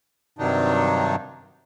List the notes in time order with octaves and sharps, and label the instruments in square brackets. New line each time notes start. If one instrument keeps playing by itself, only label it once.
[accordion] G2 C3 D#3 F#3 D4 D#4